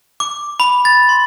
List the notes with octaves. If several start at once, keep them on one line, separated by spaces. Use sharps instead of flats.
D6
B5
A6
C6